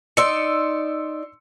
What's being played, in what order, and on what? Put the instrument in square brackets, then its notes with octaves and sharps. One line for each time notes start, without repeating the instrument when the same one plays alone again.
[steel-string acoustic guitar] D#4 D5 [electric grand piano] C6 E6 C#7